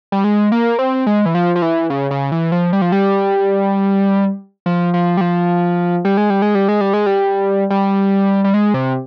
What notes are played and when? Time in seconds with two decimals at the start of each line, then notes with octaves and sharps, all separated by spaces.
0.12 G3
0.24 G#3
0.52 A#3
0.79 C4
1.07 G#3
1.26 E3
1.35 F3
1.56 F3
1.62 E3
1.90 C#3
2.11 C#3
2.32 E3
2.52 F3
2.73 G3
2.82 F3
2.92 G3
4.66 F3
4.94 F3
5.17 G3
5.21 F3
6.05 G3
6.17 G#3
6.30 G3
6.42 G#3
6.55 G3
6.68 G#3
6.81 G3
6.94 G#3
7.06 G3
7.70 G3
8.44 G3
8.54 G#3
8.74 C3